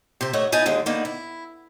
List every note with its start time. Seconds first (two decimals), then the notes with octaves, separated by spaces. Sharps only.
0.21 C3 C5 E5
0.33 D#2 A3 C#5 D#5 E5 F#5
0.52 B3 D#4 E4 B4 G#5 A5
0.66 D#2 D3 G#3
0.86 D3 D#3 A#3 B3 D#4
1.05 E4